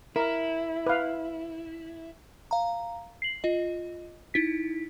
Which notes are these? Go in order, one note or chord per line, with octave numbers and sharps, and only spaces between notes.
E4 A#4
B4 F5
F5 A#5
C7 F#7
F4 D#5
D#4 E4 B6